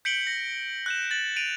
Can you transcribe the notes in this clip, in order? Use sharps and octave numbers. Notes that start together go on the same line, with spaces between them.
G6 B6 C#7 D7 F#7 G7
A#6
F#6 G6 E7
A6 F#7
D7 D#7 F7